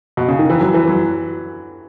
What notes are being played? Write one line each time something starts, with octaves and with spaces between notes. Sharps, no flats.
B2
C#3
D#3
E3
F#3
E3
F#3